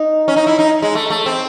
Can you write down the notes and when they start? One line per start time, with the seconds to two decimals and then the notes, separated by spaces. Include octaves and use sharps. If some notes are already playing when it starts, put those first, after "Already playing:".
Already playing: D#4
0.28 C#4
0.36 D#4
0.47 E4
0.59 D#4
0.82 G#3
0.95 A3
1.10 A3
1.26 C4